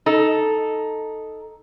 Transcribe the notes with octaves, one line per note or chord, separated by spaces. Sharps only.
D#4 A4